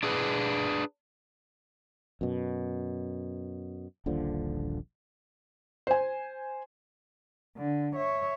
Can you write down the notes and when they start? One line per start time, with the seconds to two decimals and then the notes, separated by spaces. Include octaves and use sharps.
0.03 D4 G#4 B4
2.21 F#2 B2
4.06 D#1 A#1 D3 F3
5.87 C5 G#5
7.57 D3
7.96 C#5 E5